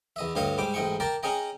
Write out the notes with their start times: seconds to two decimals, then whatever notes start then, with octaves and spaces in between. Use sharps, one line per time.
0.16 E2 D#5 E5
0.35 D2 G2 G4 C#5 D#5 F5
0.58 G#2 G3 G5 D6
0.74 A1 G#2 D#5 G5 C#6
1.00 A#4 D5 G5 A5 A#5
1.23 C#4 G#4 C#5 D#5 G5 A#5